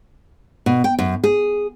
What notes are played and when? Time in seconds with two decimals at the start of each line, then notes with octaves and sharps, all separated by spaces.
0.66 B2
0.84 G5
0.99 F#2
1.24 G#4